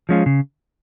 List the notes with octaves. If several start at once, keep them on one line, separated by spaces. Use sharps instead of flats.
F3 G#3 C#4 F4
C#3